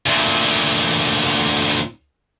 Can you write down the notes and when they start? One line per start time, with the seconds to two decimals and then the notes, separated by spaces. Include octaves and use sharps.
0.06 D2 A#2